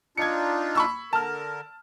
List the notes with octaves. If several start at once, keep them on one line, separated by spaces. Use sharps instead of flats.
D4 D#4 F4 G#6 C#7
B5 C#6 E6
D3 A#4 A5 F6